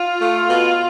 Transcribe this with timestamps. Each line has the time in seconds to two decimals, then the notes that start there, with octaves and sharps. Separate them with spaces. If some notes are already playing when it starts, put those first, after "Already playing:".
Already playing: F4
0.20 A3
0.49 B2